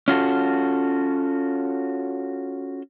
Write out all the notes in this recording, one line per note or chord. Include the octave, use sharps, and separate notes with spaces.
C#4 F4 F#4 A4